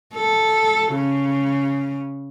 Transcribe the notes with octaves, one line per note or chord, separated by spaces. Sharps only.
A4
C#3